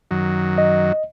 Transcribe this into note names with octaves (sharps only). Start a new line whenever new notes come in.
F#2 D#3 F#3
D#5